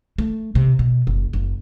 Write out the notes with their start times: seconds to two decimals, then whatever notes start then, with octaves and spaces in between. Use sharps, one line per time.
0.18 A3
0.55 C3
0.79 B2
1.07 F#1
1.33 F#1